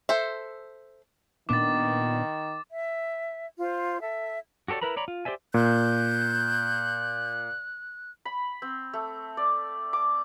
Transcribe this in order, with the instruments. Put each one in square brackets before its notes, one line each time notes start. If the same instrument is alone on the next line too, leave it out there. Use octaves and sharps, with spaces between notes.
[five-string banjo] A4 C5 E5
[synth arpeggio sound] A#2 B3 D4 [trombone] D#3 [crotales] D6 A6
[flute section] E5
F4 C5
A4 E5
[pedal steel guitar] F#4 G4 A4 C#5 D5
E4 A#4 B4 A#5 B5
C#5 D5 A#5 B5
F4
G4 C5 D5 E5 G#5
[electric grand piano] A#2 [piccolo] F#6 [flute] G6
[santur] B5
C4
A3
D5
D6